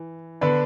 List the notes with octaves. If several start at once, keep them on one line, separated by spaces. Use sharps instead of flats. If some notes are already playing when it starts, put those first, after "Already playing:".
Already playing: E3
D3 B3 D4 B4